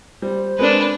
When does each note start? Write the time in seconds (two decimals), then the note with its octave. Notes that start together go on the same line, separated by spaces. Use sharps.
0.22 G3 C5
0.59 G#3 C4 D4 A#4 B4